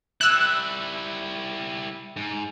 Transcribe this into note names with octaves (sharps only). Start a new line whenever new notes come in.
G3 E4 E6 F#6
G#2